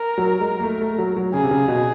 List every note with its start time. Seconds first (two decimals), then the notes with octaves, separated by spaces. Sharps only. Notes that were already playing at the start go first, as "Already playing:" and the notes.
Already playing: A#4
0.18 F#3
0.40 G#3
0.60 A#3
0.63 A3
0.81 A3
0.98 F#3
1.17 F#3
1.33 C#3 G#4
1.43 C3
1.51 C#3
1.68 B2